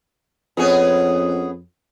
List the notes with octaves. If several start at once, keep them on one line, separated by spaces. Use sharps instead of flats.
F2 B3 C#4 G#4